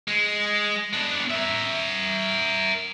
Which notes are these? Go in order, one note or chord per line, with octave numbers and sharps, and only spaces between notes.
G#3
B3 D4
A#4 E5